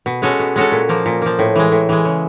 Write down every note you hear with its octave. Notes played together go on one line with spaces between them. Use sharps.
B2
G#3 C#4 F#4 A4
B2
G#3 C#4 F#4 A4
A#2
F3 A#3
A#2
F3 A#3
A2
E3 G#3
A2
E3 G#3
C#3